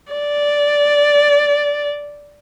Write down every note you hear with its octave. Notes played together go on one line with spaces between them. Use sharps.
D5